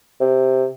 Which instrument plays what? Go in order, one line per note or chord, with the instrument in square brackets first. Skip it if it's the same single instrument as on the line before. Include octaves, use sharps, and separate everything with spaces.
[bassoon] C3